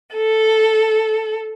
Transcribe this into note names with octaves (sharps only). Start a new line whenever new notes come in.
A4